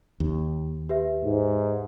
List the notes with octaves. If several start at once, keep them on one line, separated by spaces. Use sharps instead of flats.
D#2
G4 B4 E5
G#2